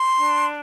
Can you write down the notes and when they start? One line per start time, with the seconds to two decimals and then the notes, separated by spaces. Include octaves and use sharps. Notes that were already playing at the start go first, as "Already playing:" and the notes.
Already playing: C6
0.17 D4